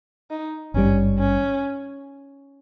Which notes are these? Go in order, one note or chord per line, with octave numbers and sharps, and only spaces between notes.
D#4
G#1 G2 G3 C#4
C#4